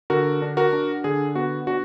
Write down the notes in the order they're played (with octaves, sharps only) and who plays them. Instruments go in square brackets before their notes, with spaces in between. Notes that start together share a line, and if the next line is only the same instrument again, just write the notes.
[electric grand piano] D3 F#4 A#4
D4
F#4 A#4
D4
D3 G#4
B3 F#4
D4 F#4